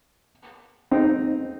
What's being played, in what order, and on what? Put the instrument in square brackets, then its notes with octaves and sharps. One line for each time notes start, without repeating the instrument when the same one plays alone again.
[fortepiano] C4 D#4